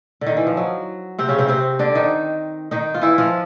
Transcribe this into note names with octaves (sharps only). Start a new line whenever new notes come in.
D3
D#3
E3
F3
F#3
C3 C4
C#3 C#4
C3 C4
C3 C4
D3 D4
D#3 D#4
D#3 D#4
F4
E3 E4
F3 F4